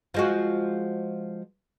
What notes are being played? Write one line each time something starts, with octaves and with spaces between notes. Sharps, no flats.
F3 G#3 F#4